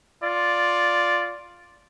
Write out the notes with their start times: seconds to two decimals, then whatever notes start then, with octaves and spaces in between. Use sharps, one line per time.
0.23 F4 D5